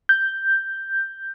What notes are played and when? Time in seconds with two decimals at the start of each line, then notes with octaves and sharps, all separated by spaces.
0.09 G6